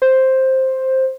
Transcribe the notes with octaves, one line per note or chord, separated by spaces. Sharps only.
C5